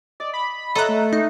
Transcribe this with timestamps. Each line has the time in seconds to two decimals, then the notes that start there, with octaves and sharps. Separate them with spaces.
0.20 D5 D#5
0.34 B5
0.75 A4 C#5 D#5 E5 A#5 F#6
0.89 A3
1.13 D#4